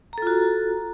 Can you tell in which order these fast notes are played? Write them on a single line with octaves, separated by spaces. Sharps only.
A#5 A4 F4 F#4